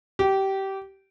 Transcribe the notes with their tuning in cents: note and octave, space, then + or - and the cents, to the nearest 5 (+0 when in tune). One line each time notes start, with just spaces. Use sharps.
G4 -20